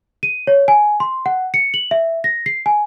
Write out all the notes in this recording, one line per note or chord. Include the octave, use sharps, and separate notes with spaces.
D#7
C#5
G#5
C6
F#5
C#7
F#7
E5
A#6
C7
G#5